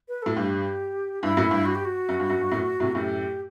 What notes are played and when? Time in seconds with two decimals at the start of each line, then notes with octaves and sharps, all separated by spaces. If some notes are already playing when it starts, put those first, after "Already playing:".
0.09 B4
0.22 A2 A4
0.36 G2 G4
1.22 G2 E4
1.37 F#2 A2
1.51 G2
1.66 F#4
1.75 G4
1.85 F#4
2.09 F#2
2.20 G2
2.30 F#2
2.41 G2
2.52 F#2 A2
2.80 A2 C3
2.95 F#2 A2 G4